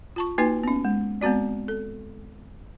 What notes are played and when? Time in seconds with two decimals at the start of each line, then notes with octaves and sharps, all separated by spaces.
0.16 F4 A5 C#6
0.38 A#3 D#4 F#4 B4 G#5
0.63 B3 C#4
0.85 G#3
1.21 G#3 B3 C4 F#4 D5
1.68 A4